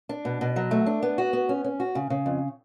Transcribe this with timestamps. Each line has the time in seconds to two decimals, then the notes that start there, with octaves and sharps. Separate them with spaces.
0.09 D4
0.25 B2
0.41 B2
0.56 F#3
0.71 A3
0.86 D4
1.02 B3
1.18 F#4
1.33 B3
1.49 C#4
1.64 C#4
1.80 F#4
1.95 C#3
2.10 C#3
2.26 F2